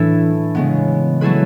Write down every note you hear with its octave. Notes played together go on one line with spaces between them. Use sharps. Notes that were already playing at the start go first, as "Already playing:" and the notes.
Already playing: A2 E3 A3 D4 E4
C#3 G#3 B3
F#3 A3 E4 G#4 B4